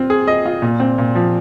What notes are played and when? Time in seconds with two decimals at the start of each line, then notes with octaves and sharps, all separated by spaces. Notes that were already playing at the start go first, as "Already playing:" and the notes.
Already playing: C4 F4
0.10 G#4
0.27 D#5
0.46 F4
0.62 A#2
0.80 C4
0.98 A#2
1.15 F3